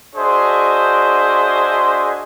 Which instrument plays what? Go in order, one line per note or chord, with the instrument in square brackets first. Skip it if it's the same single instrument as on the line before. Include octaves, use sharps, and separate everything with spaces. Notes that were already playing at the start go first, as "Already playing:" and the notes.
[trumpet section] D4 F#4 G#4 C5 D#5 E5